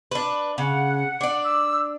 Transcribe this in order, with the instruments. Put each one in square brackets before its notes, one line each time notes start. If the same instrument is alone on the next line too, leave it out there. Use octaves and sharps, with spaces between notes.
[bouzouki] D4 B4
[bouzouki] C#3 [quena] F#5
[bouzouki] D4 D5
[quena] E6